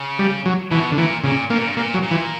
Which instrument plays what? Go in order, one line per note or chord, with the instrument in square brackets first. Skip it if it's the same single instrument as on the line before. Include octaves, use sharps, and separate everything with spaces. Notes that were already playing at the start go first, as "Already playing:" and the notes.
Already playing: [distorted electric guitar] C#3
[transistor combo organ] G3
F#3
[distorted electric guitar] B2 [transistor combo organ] E3
[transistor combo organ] D3
[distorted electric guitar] A#2 [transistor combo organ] E3
[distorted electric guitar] A#2 [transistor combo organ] C#3
[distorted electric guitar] G2 [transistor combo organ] A#3
[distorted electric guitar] A#2
G2
[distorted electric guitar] A#2 [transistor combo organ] A#3
[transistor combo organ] F#3
[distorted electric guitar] A#2
[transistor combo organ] E3